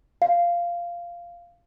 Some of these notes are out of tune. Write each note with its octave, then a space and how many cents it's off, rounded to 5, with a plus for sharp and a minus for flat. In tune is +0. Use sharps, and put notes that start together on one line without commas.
F5 -10